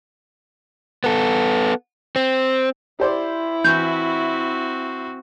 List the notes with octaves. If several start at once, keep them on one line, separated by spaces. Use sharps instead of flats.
B3 A4
C4
E4 G4 C5 D5
E3 C4 F#4 G6